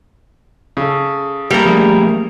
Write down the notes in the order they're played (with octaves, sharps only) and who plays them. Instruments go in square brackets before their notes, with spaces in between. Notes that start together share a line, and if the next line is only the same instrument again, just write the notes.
[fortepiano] C#3 A4
[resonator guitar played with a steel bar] G3 A#4 [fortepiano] A3 A#3
[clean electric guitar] F3 A3 A#3 [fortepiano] G#4